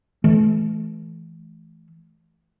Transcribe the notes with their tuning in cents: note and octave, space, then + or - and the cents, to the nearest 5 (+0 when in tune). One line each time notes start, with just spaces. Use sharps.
E3 +0 A3 -35